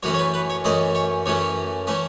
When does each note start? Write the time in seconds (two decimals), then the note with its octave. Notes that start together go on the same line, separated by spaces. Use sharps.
0.03 F#2 E3 A3 C#4 C#5
0.14 C#5
0.19 B4
0.34 B4
0.50 C#5
0.64 F#2 E3 A3 C#4 D#5
0.95 C#5
1.26 F#2 E3 A3 C#4 C#5
1.87 E3 A3 C#4